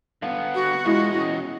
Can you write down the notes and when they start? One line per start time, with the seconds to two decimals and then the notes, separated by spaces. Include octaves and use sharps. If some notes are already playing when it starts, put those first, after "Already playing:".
0.22 D3 B3 F5
0.55 F#4
0.85 E2 G#3 E4 F4 D#5
1.15 C#4